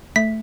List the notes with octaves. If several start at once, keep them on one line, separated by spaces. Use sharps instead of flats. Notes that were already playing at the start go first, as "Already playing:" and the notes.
A3 B6